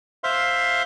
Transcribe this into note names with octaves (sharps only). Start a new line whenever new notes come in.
C5 E5 F5 C6